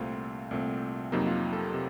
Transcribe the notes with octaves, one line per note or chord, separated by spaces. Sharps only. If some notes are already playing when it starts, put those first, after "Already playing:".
Already playing: C2 A#2 A3 C4 F4
C2 A#2 A3 C4
F2 C3 F#3 A#3 D#4
F4
D#4
A4
C3